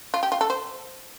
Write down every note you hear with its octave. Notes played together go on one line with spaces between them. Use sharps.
F4
G4
F4
A4
C5